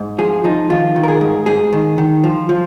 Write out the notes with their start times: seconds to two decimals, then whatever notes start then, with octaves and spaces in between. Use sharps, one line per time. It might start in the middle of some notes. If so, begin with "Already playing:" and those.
Already playing: G#2
0.18 F3 G#4
0.44 F3 D#4
0.70 D#3 F4
0.96 D#3
1.03 A#4
1.08 G#4
1.21 G#2
1.46 G#2 G#4
1.73 D#3
1.98 D#3
2.24 F3
2.49 F3